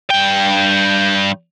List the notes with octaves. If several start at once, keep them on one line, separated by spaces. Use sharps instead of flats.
G2 G5